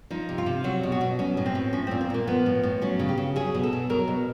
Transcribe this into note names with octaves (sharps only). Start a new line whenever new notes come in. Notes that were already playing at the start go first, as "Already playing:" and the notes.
F3 D#4
C3
F4
C3
F#3 F#4
B2
F#4
B2
F#3 C#4
A2
C4
A2
F3 C#4
A#2 C4
C4
A#2 A#3
F3 B3
A2
A2
F#3 C#4
C#3
G4
C#3
F#3 G#4
B2
A4
B2
F#3 A#4
B2